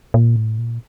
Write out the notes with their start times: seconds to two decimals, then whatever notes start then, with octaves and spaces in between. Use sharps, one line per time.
0.14 A#2
0.36 A2
0.58 A#2